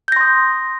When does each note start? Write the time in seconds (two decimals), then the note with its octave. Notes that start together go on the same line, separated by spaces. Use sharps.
0.08 G6
0.12 A#6
0.16 C6
0.21 D#6